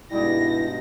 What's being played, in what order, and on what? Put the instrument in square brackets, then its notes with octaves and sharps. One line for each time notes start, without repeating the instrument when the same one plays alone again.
[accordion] G2 B2 [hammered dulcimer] G3 G#3 D#4 [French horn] E4 [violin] A#6